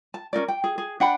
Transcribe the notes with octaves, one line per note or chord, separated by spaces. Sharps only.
A5
C#4 D#4 A#4 D5
G5
G#4
G#4
D4 F#5 G5 B5